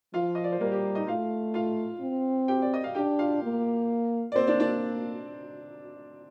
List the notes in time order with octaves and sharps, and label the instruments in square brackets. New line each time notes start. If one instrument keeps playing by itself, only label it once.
[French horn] F3 [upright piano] F4 F5
[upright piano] D#5
D5
C5
[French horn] G3 [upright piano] A#3 A#4
[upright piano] G4
D#4 D#5
[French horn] A3 [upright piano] F4 F5
[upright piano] F4 F5
[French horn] C4
[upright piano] G4 G5
D5
D#5
F5
[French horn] D4 [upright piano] G4 G5
[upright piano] F4 F5
[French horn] A#3
[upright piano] D5
[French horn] A#3 [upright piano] C4 C5
[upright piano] D4 D5
D4 D5